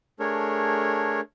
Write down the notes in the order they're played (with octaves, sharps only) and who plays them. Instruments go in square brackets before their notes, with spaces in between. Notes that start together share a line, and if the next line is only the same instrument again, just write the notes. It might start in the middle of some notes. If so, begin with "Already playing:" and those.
[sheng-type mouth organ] A3 D4 G#4 A#4 C#5